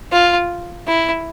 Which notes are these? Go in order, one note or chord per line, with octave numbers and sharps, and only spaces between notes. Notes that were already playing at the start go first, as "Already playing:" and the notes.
F4
E4